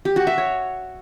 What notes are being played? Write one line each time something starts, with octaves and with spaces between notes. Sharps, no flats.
G4
F#4
E5
C#5